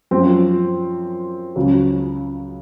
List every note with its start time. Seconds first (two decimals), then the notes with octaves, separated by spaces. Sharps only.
0.11 F#2 F3 C4 F4
1.56 C#2 C#3 F#3